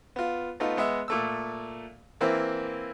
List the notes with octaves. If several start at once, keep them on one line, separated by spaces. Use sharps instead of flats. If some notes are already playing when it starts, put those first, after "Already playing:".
B3 F4
A3 B3 D#4 F4
G#3 B3 D#5 E5
A#2 A3 E6
E3 A#3 C4 E4